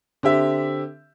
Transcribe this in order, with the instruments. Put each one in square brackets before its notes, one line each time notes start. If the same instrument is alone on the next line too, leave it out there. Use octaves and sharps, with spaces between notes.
[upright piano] D3 C4 G4 E5